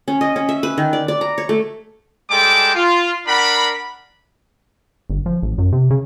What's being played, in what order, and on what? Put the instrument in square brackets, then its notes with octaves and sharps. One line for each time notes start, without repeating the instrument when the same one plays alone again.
[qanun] C#4
D#5
C#4
E5
B4
D#3
D5
D5
A#5
C#5
A3
[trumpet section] G3 G#3 A4 G5 A5 D6
F4
D4 A#4 F#5 B5
[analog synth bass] G1
F3
A1
F#2
C3
C#3